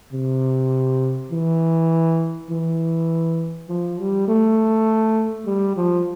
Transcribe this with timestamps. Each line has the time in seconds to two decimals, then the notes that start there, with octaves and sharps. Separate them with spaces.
0.12 C3
1.31 E3
2.50 E3
3.68 F3
3.98 G3
4.28 A3
5.46 G3
5.76 F3